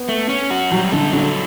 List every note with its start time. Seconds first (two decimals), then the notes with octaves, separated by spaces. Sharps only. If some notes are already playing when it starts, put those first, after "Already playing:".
Already playing: B3
0.09 A3
0.29 C#4
0.50 F#4
0.71 F#3 G3
0.92 D3 A4
1.12 D3 F#3